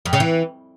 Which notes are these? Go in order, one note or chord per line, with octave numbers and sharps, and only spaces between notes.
F2
C#3
E3